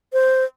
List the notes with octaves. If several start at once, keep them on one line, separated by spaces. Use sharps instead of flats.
C5